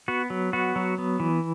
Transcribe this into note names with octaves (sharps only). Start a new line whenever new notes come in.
B3 F#4
F#3
B3 F#4
F#3
B3
E3